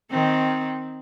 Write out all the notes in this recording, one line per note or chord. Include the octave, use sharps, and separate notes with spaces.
D#3 C4